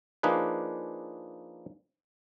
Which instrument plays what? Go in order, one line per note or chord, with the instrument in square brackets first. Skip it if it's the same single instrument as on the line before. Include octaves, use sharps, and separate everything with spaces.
[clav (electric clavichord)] F3 A#3 D4 D#4 G#4 B4